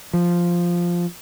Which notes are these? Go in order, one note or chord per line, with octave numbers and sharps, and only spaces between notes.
F3